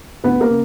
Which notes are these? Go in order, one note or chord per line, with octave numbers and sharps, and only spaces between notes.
D2 B3 B4
A#3 A#4
C#3